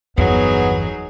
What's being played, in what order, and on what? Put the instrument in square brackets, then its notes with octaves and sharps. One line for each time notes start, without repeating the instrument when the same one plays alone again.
[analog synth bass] G1 [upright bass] E2 [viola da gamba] F#3 D#4 G#4 [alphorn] B3